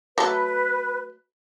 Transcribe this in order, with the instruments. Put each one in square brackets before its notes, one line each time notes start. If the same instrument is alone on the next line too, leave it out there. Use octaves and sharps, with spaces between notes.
[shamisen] F#3 A3 A4 [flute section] B4